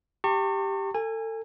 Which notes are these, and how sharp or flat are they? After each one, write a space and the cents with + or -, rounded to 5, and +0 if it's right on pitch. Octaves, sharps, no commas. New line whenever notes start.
G4 +0 A5 +45 C#6 -20
A4 +30 G#5 -20